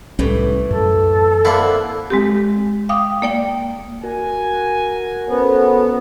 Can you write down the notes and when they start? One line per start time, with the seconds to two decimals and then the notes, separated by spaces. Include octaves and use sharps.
0.19 C2 A2 E3 G3 C#4
0.71 F#2 A4
1.45 D3 A#3 C4 E4 F#5
2.10 G#3 C4 G4
2.89 F5 G5 D6 D#6
3.22 A#3 D5 G5
4.03 F#4 A#4 G#5
5.29 B3 C#4 A4 C5